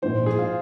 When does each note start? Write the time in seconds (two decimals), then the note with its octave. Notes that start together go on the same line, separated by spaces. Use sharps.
0.02 A#1 G#2 E3 C5
0.26 G#4
0.38 F4